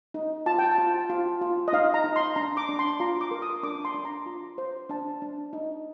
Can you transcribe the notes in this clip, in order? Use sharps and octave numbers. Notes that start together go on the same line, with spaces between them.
D#4
F4 A5
G5
A5
F4
F4
F4
D#5
D#4 F5
A#5
D#4
C6
D4 A#5
D6
D4
C6
F4 A#5
D6
A#4
D#6
D4 D6
C6
D4
A#5
F4
C5
D4 A5
D4
D#4